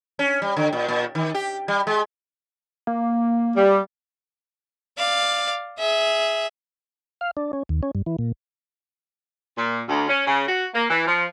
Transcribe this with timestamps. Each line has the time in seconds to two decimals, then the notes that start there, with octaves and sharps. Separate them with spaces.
0.19 C#4
0.42 G3
0.56 D3
0.73 A#2
0.88 A#2
1.15 D#3
1.34 G4
1.68 G3
1.87 G#3
2.87 A#3
3.56 G3
4.98 D5 F5
5.79 G#4 E5
7.21 F5
7.37 D4
7.53 C#4
7.69 D#2
7.83 C#4
7.95 G2
8.06 E3
8.19 A#2
9.56 A#2
9.88 D2
10.08 C#4
10.26 C#3
10.48 F#4
10.74 A#3
10.89 E3
11.07 F3